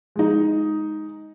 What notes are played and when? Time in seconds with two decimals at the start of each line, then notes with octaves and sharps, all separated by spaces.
0.16 G#3 D#4